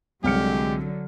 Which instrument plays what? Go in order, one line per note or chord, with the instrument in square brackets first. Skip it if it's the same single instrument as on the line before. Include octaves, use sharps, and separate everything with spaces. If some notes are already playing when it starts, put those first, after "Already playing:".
[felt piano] C2 F6 C#7 [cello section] D3 F#3 [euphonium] G#3 [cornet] G4